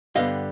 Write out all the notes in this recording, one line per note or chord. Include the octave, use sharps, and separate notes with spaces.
G2 D3 G3 B3 D#5 F5